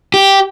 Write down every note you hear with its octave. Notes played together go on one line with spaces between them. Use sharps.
G4